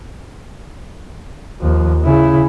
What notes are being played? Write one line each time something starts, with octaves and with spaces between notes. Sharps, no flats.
D#2 F3
C#3 E4